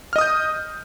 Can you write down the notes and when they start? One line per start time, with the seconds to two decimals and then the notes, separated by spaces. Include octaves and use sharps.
0.13 F6
0.16 D#5
0.18 D#6
0.21 G6